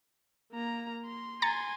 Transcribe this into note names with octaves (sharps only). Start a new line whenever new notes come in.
A#3 A#5
C6
G#5 A#5 C6 A6 C#7